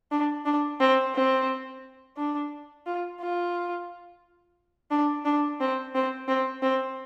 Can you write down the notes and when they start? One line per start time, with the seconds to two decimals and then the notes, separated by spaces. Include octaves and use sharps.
0.11 D4
0.45 D4
0.80 C4
1.15 C4
2.17 D4
2.86 F4
3.20 F4
4.91 D4
5.25 D4
5.60 C4
5.95 C4
6.28 C4
6.63 C4